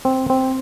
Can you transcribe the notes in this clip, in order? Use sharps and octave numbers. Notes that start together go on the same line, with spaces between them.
C4
C4